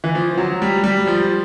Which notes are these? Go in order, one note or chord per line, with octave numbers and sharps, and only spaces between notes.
E3
F3
F#3
G3
G3
F3